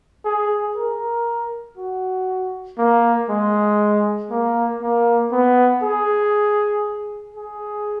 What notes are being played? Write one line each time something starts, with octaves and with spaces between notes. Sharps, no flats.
G#4
A#4
F#4
A#3
G#3
A#3
A#3
B3
G#4
G#4